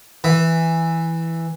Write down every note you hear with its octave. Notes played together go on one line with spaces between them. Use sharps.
E3